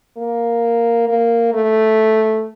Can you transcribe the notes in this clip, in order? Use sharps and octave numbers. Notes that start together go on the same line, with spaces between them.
A#3
A#3
A3